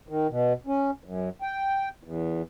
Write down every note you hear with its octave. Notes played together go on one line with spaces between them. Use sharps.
D#3
B2
C#4
F#2
G5
E2